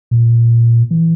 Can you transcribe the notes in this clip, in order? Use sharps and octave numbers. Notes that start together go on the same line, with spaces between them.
A#2
E3